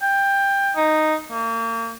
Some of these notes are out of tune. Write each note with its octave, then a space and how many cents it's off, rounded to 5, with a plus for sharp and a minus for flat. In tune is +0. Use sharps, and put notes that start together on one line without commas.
G5 +15
D#4 -5
A#3 -35